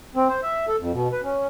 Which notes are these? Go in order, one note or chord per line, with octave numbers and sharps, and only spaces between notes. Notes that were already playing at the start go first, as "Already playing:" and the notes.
C4
C5
E5
A4
F2
B2
B4
C#4